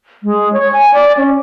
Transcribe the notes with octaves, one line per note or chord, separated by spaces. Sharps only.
G#3
C#5
G#5
D5
C#4